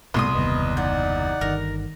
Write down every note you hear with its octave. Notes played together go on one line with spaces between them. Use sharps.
C2 G#2 B2 A3 C6 C#6 D#6
F#1 D#2 B3 B4 D#5
D#4 D5 F#5 G6
G1 D#3 A#4